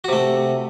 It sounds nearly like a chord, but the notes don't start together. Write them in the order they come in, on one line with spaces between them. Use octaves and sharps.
F#4 C3 A3